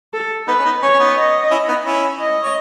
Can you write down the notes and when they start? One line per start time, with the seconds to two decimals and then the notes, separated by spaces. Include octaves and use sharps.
0.14 A4
0.48 B3 D#4 B4
0.59 C#4
0.65 B3 D#4
0.82 C#4 C#5
0.93 C#4
0.99 B3 D#4
1.17 D#5
1.51 C#4 E4
1.68 B3 D#4
1.86 C#4 E4
2.20 D#5
2.43 C#5